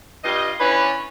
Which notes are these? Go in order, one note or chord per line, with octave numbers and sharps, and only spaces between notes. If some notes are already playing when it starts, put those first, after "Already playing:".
G2 F4 G4 D#5
E3 C#4 D4 B4 C#5 D5